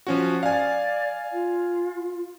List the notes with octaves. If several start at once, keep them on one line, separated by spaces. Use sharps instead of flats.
F3 C#4 F#4
D5 F5 G#5
F4